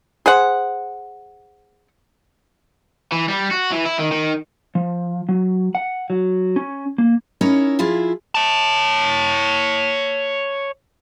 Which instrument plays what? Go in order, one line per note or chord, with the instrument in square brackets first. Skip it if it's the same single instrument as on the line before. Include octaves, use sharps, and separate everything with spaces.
[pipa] G#4 C5 F#5
[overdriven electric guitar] E3
G3
F#4
E3
E4
D#3
D#3
[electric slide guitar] F3
F#3
F#5
F#3
C#4
A#3
[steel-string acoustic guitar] C#4 D#4 E4 A#4 C#5
F3 E4 F4 G#4
[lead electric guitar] C#5 A5